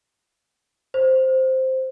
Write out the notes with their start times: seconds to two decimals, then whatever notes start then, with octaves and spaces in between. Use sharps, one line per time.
0.94 C5